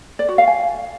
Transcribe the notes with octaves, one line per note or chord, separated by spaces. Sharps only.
D5
F#4
F5
G#5